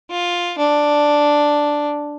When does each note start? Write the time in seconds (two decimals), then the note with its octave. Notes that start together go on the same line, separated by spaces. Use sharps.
0.11 F4
0.59 D4